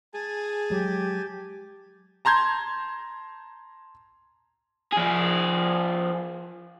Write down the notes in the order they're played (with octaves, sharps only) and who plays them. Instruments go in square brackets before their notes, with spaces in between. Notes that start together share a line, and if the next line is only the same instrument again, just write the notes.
[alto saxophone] G#4 [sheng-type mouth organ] G#5 A5
[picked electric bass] F#3 G#3 [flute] G4
[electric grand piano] A5 A#5 C6 G6 G#6
[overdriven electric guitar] F3 G#4